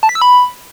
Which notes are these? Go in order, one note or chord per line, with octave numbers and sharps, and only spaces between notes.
A5
B6
E6
B5